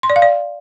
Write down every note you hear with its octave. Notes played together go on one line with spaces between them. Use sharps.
C6
D5
F5
D5